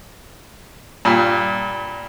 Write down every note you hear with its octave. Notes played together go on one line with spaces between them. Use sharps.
G2 A#2